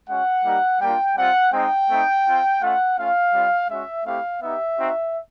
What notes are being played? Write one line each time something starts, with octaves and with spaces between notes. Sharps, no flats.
G#3 C#4 F#4 F#5
G3 A#3 D#4 G4
G3 A#3 D4 F4 G5
G3 C4 F4 F#5
G#3 C4 D#4 G5
A3 C4 D#4
C4 F4
A3 C#4 F4 F#5
A3 C#4 F4 F5
G3 C4 F4
G#3 C#4 F#4 E5
A3 C4 E4 G4 F5
B3 D#4 G4 E5
C4 D#4 F#4